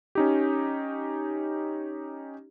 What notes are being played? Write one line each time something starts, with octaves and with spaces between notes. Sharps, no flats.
C#4 D#4 G4